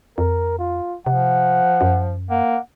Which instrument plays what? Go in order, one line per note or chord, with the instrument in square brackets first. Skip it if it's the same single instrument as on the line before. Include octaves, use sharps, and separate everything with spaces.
[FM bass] F2 [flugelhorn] A#4
[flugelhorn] F4
[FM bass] C3 [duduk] F3 [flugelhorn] F#5
[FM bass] F#2
[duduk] A#3 [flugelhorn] F#5